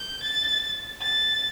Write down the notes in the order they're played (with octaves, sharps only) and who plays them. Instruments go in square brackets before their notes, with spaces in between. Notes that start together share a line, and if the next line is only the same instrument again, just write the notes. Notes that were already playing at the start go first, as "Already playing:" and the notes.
Already playing: [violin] G6
A6
A6